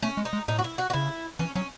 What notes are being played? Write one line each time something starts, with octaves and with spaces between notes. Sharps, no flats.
A3 C#4
G#3
D#4
G#3
A2 D#4
F#4
E4
F#4
F#4
C#3 E4
E3 C#4
F#3 C#4